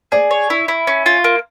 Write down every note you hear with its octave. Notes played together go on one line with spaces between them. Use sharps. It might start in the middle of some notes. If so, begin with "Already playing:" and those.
G#4 D5
C#5
E4
E4
C#4
F4
A#3